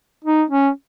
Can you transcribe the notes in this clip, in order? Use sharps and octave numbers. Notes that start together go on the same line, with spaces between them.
D#4
C#4